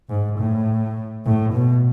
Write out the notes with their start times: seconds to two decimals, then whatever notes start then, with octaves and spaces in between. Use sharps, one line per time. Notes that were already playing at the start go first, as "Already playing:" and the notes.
0.09 G#2
0.39 A2
1.26 A2
1.54 B2